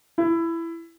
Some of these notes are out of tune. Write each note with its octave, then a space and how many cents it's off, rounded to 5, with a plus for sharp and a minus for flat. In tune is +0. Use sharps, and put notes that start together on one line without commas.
E4 +15